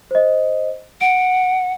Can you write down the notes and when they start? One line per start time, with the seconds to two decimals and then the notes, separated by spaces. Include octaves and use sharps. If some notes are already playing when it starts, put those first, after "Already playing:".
0.11 C5 D#5
1.01 F#5 D7